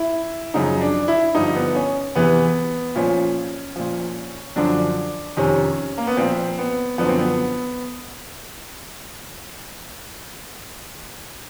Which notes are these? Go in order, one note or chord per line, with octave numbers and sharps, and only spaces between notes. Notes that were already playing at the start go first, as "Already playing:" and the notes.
Already playing: E4
F#2 C#3 F3 D#4
D4
E4
G2 D3 F3 D#4
B3
C#4
E2 C3 E3 B3
A#2 F3 C#4
A#2 F3
F#2 D3 F3 D4
F2 C3 D#3 C#4
A#3
B3
A#2 F3 C4
B3
F#2 D3 F3 B3
C4
B3